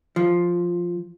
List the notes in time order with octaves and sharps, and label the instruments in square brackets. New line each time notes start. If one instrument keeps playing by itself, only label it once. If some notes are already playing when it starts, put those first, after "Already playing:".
[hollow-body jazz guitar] F3